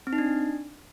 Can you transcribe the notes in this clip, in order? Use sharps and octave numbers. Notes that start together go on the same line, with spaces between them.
C4
D#4
D4